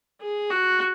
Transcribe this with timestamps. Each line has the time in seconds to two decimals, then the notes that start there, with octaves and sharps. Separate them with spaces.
0.21 G#4
0.50 F#4